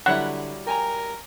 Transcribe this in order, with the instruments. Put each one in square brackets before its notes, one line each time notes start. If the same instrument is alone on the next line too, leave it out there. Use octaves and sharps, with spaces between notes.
[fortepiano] D3 [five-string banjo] F#3 G3 E4 [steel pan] F#5
[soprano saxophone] A#4 [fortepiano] G5 G#5 A#5